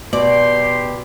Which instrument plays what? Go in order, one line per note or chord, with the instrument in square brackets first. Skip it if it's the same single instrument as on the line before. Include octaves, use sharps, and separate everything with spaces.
[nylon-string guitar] B2 [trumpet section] G4 C6 [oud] D5